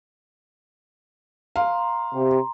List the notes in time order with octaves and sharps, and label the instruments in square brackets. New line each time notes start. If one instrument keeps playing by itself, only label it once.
[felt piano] F5 [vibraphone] A#5 C6
[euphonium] C3 [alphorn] G4